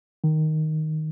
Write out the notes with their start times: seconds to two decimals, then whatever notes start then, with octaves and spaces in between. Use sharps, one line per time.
0.24 D#3